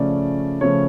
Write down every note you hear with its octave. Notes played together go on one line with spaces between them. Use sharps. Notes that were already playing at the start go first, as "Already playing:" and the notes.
Already playing: C#3 F3 A3 C#4 D5
C#3 F3 A3 C#4 C#5